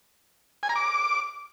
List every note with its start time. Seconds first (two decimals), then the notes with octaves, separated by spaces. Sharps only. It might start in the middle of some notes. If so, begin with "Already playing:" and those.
0.63 G#5
0.69 A#5
0.76 D6